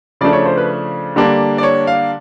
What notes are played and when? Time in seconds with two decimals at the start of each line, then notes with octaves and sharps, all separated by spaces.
0.21 C#3 F3 A3 D4 D5
0.33 C#5
0.46 C5
0.57 B4
1.16 D3 G3 A#3 D4
1.58 D5
1.63 C#5
1.87 F5